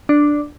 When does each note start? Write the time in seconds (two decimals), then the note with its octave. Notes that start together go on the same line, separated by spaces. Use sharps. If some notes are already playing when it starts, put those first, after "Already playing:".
0.09 D4